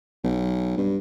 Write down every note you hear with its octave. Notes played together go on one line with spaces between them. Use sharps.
B1
G2